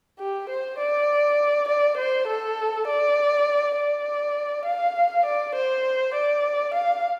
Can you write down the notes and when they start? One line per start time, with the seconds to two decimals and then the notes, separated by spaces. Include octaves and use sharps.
0.19 G4
0.49 C5
0.79 D5
1.68 D5
1.97 C5
2.27 A4
2.87 D5
3.76 D5
4.65 F5
5.26 D5
5.55 C5
6.14 D5
6.74 F5